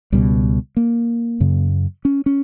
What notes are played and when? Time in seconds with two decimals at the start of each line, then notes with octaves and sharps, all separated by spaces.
0.12 C#2 B2 G3
0.77 A#3
1.40 F#2 C#3
2.05 C#4
2.26 C#4